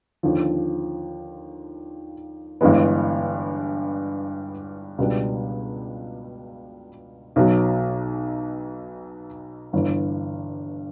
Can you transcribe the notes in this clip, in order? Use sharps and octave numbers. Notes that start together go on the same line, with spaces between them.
D#2 D3 F3
G1 G2 E3 G#3 B3
C#2 B2 G3 B3 D4
B1 B2 F#3
G1 G2 E3